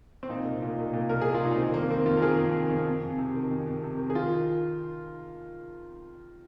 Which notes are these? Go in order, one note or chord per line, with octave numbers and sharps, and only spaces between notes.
C4
A#2 D#4
C2
A#2
C2
A#2
C2 A#4
A#2 G#4
F4
C2 D#4
D#3 C4
F2 A#3
D#3 C4
F2 F4
A#4
D#3 G#4
F2
D#3
F2
F2
F2
C3
D#3
F2
F2
C3
D#3
G#4
D#3 F4